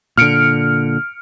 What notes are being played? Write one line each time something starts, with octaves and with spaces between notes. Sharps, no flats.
A#2 D3 F6 C#7 D7